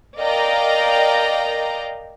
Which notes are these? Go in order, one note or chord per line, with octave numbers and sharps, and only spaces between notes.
A#4 D5 D#5 F5 G5 A#5